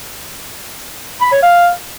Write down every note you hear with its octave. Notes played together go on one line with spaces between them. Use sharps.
B5
C#5
F5